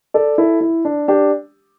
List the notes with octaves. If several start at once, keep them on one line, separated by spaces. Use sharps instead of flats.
A4 D5
E4 A4
E4
D4
D4 G4